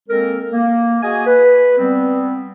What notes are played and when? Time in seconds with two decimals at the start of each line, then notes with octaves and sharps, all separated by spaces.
0.09 G#3 A#3 C4 A4 A#4
0.52 A#3
1.03 F#4 G#4 D#5 G#5
1.27 B4
1.78 G3 B3 C4